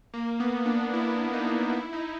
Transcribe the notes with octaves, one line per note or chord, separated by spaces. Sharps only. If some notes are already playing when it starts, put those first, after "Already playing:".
A#3
B3
D4
E4
D#4
E4
D#4